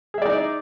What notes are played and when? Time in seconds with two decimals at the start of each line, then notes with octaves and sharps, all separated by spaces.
0.14 G#4
0.18 E5
0.22 D5
0.26 D#4